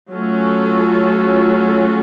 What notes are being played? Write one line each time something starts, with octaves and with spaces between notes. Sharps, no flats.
F#3 A3 C#4 F4 A4